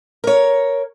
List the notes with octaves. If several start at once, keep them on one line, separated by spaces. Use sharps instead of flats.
A#4 C#5